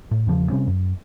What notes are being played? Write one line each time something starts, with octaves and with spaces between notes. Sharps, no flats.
A2
E2 C#3 F3
C3 G3 C4 C#4
F#2